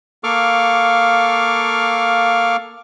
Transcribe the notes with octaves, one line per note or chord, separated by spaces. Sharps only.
A#3 A4 F5 C#6 D6 F6